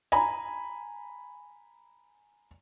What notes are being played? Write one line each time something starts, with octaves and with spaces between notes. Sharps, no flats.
G#5 A#5 B5